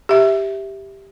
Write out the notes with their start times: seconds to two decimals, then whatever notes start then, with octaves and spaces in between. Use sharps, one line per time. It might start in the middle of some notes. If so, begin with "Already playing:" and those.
0.09 G4 E5